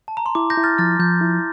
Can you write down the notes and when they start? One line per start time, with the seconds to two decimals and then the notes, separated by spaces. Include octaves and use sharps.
0.08 A5
0.17 A#5
0.26 C6
0.35 E4 D6
0.50 G6 A#6
0.57 E4
0.64 F6 A6
0.78 F3 F6 A6
0.99 F3 G6
1.21 E4